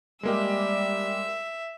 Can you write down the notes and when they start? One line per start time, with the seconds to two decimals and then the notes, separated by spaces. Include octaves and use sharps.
0.23 G3 G#3 A#3 G4 E5